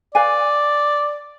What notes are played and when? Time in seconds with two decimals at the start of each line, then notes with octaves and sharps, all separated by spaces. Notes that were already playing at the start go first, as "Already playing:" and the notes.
0.14 B4 D5 F5 G#5